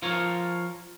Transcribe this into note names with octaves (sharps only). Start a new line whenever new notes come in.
F3 F4 A#4 C#5